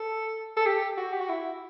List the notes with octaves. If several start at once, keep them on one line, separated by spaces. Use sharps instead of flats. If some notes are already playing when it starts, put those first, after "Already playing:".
Already playing: A4
A4
G4
F#4
G4
F#4
E4